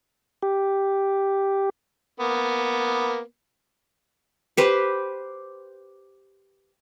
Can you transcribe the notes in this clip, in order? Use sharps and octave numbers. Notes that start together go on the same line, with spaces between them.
G4
A#3 B3
G4 B4 C5